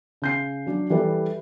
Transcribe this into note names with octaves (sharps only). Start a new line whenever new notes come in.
C#3 G6 C7
F#3 D4
E3 G3 G4 A4 B4 D5